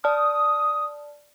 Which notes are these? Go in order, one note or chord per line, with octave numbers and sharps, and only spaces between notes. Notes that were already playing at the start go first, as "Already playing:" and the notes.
D5 A5 D#6 F6